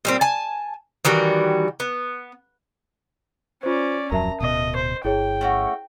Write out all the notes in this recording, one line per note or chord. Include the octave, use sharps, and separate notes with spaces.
A#2 G3 C4
G#5 A5
D#3 E3 G3 F#4
B3
C#4 F4 C5 D5
D1 F2 F#3 A#4 E5 A5 A#5
D1 B2 D#5
C5
G1 E4 G#4 C#5 G5
A3 C#4 F#4